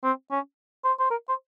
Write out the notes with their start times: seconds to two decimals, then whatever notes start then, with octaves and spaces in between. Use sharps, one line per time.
0.04 C4
0.31 C#4
0.84 C5
0.99 C5
1.11 A#4
1.28 C5